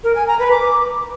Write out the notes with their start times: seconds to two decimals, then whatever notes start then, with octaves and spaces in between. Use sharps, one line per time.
0.04 A#4
0.16 G#5
0.27 A#5
0.39 B4
0.51 D6